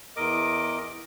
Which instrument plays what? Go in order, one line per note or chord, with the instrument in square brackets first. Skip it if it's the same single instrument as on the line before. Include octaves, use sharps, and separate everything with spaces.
[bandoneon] E2 A#4 D#5 D6